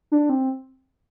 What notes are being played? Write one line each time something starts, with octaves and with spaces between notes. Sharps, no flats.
D4
C4